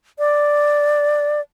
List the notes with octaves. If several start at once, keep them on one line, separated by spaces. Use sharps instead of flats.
D5